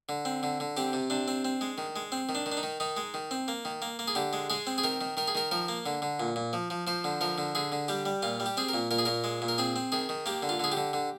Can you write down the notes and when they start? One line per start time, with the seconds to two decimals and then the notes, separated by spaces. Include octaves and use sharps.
0.09 D3
0.25 C4
0.43 D3
0.60 D3
0.77 C4 G4
0.93 C3
1.10 C3 D4
1.28 C4
1.45 C4
1.61 G#3
1.78 D#3
1.96 G#3
2.12 C4
2.29 D#3
2.35 D4
2.46 D#3
2.52 D4
2.57 D#4
2.63 D#3
2.80 D#3 D#4
2.97 G#3
3.14 D#3
3.31 C4
3.48 A#3
3.65 D#3
3.82 A#3
3.99 A#3
4.08 G#4
4.15 D3 G4
4.33 G#3
4.50 G#3 G#4
4.67 C4
4.78 G#4
4.84 D#3 A#4
5.01 D#3
5.17 D#3 A#4
5.28 G#4
5.35 D#3 A#4
5.51 F3 A#4
5.68 A#3
5.86 D3
6.02 D3
6.20 A#2
6.36 A#2
6.53 F3
6.70 F3
6.87 F3 C5
7.04 D3
7.21 F3 A#4
7.38 D3
7.55 D3 G#4
7.72 D3
7.88 G3 G4
8.06 G3
8.23 A#2 F4
8.40 G3
8.46 G4
8.57 C4 G#4
8.69 A#4
8.74 A#2
8.91 A#2 A#4
8.98 G#4
9.05 A#2 A#4
9.24 G#3
9.42 A#2
9.48 A#4
9.58 C4 G#4
9.76 C4
9.92 D#3 G#4
10.09 D#3
10.26 A#3 G4
10.43 D3
10.49 F4
10.59 D3 G#4
10.72 G4
10.77 D3
10.93 D3